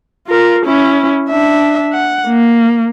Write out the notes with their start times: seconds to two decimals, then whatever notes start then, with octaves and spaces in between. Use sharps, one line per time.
0.27 F4 A#4
0.66 C#4 E4
1.30 D4 E5
1.93 F#5
2.28 A#3